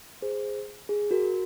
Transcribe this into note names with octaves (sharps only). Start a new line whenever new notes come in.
G#4 C5
G#4
F#4 A#4